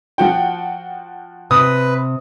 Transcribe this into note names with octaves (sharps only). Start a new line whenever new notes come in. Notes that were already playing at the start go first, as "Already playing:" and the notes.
F3 F#4 G5
C3 B4 D#6